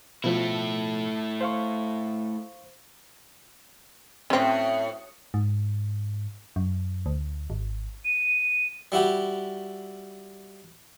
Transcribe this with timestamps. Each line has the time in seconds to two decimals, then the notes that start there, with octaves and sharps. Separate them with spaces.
0.24 B2 F3 A3 E4
1.41 C5 F5 C#6
4.30 F#2 A2 C4 C#4
5.34 G#2
6.56 F#2
7.06 D2
7.50 G#1
8.04 D#7
8.92 G3 E4 F#4 G4